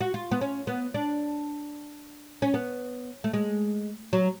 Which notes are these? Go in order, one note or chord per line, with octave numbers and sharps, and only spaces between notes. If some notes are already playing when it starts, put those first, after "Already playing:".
F#4
F4
B3
C#4
B3
D4
C#4
B3
A3
G#3
F#3